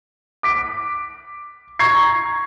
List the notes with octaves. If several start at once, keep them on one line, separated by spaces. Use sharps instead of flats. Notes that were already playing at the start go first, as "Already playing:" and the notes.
D6 B6 D7
A#5 C#6 G#6 C7